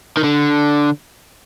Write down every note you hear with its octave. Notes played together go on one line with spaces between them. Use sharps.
D#3
D3